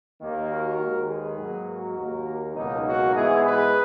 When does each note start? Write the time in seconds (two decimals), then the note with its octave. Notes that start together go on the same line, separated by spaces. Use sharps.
0.21 D#2 D#3 A#3
0.49 F#4 A#4
0.79 D#2 D#3 G#3
1.09 G#4 B4
1.38 G#2 F#3 A#3
1.67 F#4 A#4
1.97 D#2 D#3 A#3
2.55 C#2 B2 F#3 A#3 D#4
2.84 D#4 F#4
3.14 G#2 E3 B3 E4 G#4
3.44 G#4 B4